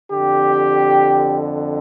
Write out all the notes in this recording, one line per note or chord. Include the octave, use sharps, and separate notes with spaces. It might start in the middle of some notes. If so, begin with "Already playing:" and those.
F2 D3 G4